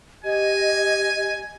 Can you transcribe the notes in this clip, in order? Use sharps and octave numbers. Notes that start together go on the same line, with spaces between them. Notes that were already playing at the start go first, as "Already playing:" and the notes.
G4 D#5 G#5